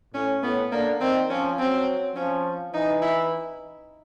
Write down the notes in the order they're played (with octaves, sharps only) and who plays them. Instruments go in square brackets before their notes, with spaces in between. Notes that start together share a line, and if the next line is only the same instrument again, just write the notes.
[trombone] A2 [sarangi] C#4
[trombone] A2 [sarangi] B3
[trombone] D3 [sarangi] A#3
[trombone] D#3 [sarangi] C4
[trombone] F3 [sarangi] C#4
[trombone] F#3 [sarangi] C4
[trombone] F3 [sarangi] C#4
[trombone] E3 [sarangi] D#4
[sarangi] E4